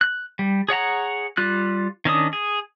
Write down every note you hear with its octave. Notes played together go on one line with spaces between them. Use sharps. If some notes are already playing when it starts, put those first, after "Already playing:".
F#6
G3
G#4 C#5 F#5 A#5
G3 F4 F#6
D#3 C#4 D4 D#6
G#4